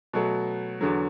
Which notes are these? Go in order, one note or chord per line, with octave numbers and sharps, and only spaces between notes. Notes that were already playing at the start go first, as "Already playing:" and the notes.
B2 F#3 A3
E2 D3 F#3